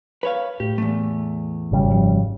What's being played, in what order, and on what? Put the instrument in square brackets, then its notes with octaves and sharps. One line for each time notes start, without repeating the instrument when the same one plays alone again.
[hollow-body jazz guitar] B4 C#5 F5
[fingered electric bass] A2 [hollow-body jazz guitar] G4
[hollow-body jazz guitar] E2 A3
[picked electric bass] G#1 C#3 G3
[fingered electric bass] F#1 F3